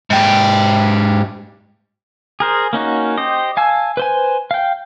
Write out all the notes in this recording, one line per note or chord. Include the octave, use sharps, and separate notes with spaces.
G#2 G4
G#4 A#4 C5
A#3 C#4 D#4 F#4
G4 C5 D#5
F5 G#5 A5 E6
B4 C5 G#5
F5 G5